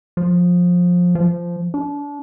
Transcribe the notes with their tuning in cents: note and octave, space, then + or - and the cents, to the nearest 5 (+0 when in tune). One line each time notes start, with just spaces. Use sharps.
F3 +20
F3 -15
D4 -30